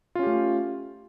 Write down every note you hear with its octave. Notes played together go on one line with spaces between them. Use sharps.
A3 C#4 F4 G4